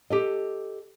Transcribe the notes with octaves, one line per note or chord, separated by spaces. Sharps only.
G4 A4 D#5